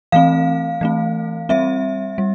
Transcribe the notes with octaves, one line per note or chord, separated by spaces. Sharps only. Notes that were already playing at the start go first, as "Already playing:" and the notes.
E3 A3 C4 F5
E3 A3 C4
G3 C4 E5
G3